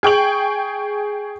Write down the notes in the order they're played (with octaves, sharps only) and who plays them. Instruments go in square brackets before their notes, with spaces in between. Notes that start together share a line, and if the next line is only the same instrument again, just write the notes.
[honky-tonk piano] G#4 G5 C#6 F#7